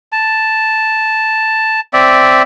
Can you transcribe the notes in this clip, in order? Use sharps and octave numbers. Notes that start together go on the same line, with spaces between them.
A5
C4 D5 E5